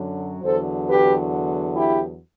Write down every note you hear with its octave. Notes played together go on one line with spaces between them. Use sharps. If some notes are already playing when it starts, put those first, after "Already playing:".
Already playing: F#2 D3 F#3
E2 D3 F#3 A4 C5
G4 B4
E4 G4